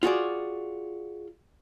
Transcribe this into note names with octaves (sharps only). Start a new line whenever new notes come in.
F4 F#4 G#4 D5